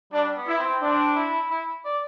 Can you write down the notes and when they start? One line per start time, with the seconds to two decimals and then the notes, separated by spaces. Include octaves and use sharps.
0.13 G3 D4
0.35 B3
0.47 E4
0.58 C4
0.81 C4 D4
1.15 E4
1.50 E4
1.85 D5